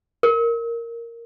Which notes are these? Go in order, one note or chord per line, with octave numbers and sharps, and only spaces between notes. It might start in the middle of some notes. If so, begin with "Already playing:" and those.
A#4